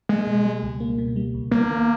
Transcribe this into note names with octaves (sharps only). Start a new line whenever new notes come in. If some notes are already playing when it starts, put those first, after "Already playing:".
G#3 A#3
B2
G3
C#2
A#3
B2
G3
C#2
A#3 B3
D#3